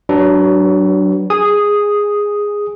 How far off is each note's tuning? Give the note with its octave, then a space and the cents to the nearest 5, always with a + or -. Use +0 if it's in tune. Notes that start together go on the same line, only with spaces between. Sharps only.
F#3 +25 D4 +0 B4 +0
G#4 -10 D#6 +0